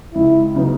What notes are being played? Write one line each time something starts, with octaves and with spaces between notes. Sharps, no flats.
C#2 E4
C#3 F#3 B3 D#4